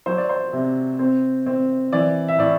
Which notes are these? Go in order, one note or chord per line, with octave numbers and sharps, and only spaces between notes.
F#3 C5
D5
C5
C3
C4
C4
E3 D5
E5
A2 D5